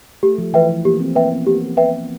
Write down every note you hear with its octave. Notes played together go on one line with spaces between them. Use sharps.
A3 G4
F3
E3 B4 E5 G5
F3
A#3 G4
C4
A#3 B4 E5 G5
B3
A#3 G4
B4 E5 G5